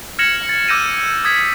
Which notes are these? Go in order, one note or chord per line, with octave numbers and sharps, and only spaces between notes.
F6 G#6 A#6 C#7 E7 F#7
A6
D6 E6 G6 A#6 D#7 E7
D#6 G#6 B6